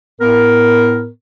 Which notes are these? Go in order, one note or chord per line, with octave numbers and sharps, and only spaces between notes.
A2 B3 A#4